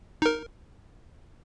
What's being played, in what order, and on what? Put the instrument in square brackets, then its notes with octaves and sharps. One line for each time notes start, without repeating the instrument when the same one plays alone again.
[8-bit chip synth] D#4 A#4